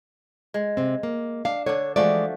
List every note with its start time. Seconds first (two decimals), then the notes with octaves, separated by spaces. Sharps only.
0.54 G#3
0.77 C3 C4
1.03 A#3
1.45 D4 F5
1.66 D3 D4 C#5
1.96 E3 F3 G#3 A3 F#4 D5